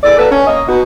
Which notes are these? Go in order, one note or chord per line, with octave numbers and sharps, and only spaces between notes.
E2 A4 D5
A#3 F#4 A4 B4
C#4
A#3 C#5 D#5
B2 B3 D#4 F#4